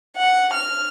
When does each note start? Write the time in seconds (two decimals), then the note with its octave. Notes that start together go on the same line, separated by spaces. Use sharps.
0.17 F#5
0.53 F6